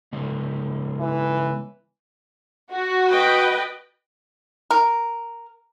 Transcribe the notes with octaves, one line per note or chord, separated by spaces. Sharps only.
C#3 G#3 B3
E3
F#4
B4 D#5 G5
A#4